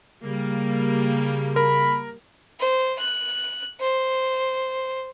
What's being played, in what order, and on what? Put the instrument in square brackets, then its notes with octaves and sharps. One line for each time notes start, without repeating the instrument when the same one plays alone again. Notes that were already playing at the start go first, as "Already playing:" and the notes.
[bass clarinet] C#3 [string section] G3 A#3
[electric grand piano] A#4 [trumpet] B5
[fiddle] C5
F#6
C5